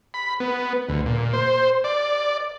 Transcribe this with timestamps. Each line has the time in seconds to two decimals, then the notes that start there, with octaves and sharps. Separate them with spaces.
0.14 B5
0.40 B3
0.89 D2
1.06 A#2
1.33 C5
1.84 D5